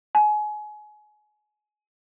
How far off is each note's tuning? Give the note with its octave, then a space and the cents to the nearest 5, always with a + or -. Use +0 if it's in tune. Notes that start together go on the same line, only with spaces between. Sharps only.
G#5 +30